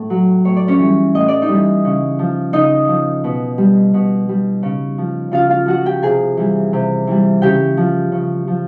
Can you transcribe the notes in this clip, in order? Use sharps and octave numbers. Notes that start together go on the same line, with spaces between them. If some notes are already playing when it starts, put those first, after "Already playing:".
Already playing: A2
F#3
A2 C#5
D5
C#4 C#5
E3 G3
A2 D#5
D5
D#4 D#5
E3 G3
C#3
F3
C#3 D#4 D#5
F3
B2
G3
B2
G3
C#3
F3
C#3 F4 F5
F4 F5
F3 F#4 F#5
G4 G5
C3 G#4 G#5
E3 G3
C3
E3 G3
C#3 G4 G5
F3
C#3
F3